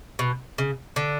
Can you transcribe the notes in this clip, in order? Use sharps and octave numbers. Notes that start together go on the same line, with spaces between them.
B2
C#3
D3